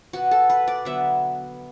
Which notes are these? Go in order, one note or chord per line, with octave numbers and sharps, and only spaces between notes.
B2 B3 F#4
A4
B4
D5
D3 F#3 B3 E5